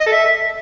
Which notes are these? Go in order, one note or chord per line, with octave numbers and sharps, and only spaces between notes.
D#5
A4
E5